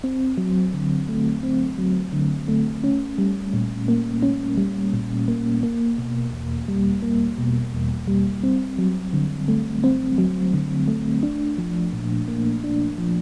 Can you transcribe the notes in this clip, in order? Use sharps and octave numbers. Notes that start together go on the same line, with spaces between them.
C4
F#3
D3
A3
C4
F#3
D3
A3
C#4
G3
A#2
A#3
C#4
G3
A#2
A#3
A#3
B2
E2
G3
A#3
B2
E2
G3
C4
F#3
D3
A3
C4
F#3
D3
A3
D4
F3
A#2
A#3
D4
F3